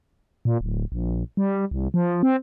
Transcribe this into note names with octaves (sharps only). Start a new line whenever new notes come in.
A#2
D1
A#1
G3
C2
F3
C4